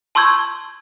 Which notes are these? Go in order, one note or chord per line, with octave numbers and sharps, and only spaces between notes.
A5 C6 C#6 E6 G6 G#6